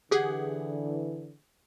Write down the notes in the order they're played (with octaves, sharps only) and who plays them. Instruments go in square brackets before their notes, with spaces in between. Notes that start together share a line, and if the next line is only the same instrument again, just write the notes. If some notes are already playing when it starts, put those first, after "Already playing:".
[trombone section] D3 E3 [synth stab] G4 G#4 F#5